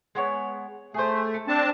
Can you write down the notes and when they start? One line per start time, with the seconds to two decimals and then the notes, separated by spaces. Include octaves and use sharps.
0.15 G#3 B3 C#5
0.94 A3 G#4 C5
1.34 A4
1.48 C4 D4 A5